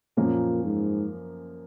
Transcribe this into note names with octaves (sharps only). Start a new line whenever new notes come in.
F#2 A#2 F3 A#3 C#4
G#2